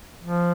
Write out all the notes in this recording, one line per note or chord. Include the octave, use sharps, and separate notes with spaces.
F3